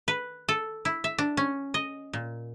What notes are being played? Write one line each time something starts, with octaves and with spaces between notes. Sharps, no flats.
B4
A4
E4
E5
D4
C#4
D#5
A#2